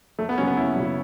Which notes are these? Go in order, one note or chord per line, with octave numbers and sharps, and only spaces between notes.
F#1 A3
B3
F#2 C#3 F#3 C#4
B3
F#1 E4
F#2 C#3 F#3